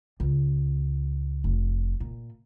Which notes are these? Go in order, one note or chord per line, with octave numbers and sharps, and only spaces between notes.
C#2
F1
A#2